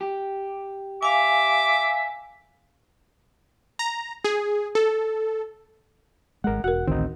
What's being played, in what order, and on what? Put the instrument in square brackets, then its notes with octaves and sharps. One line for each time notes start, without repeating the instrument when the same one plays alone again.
[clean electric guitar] G4
[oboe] E5 [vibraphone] F5 G#5 [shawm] D6
[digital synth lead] A#5
G#4
A4
[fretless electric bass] G#1 G#3 [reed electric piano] A#4 F#5
[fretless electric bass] E1 [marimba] F#4 A#4 [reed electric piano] F#5
[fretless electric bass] A1 D2 D#3 [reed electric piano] C4 D#4